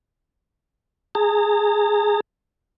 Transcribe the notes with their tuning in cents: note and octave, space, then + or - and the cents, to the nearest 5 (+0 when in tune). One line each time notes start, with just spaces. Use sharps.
G#4 +0 A#5 -45